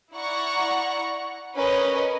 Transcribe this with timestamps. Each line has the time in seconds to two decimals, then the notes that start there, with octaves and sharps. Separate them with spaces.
0.14 E4 D5 F#5 A#5 C#6
1.56 C#4 A#4 B4 D#5